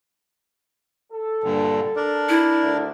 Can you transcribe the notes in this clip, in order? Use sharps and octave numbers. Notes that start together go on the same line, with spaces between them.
A4
G2 A#2 D3
D4 A#4 D5
E4
D2 D3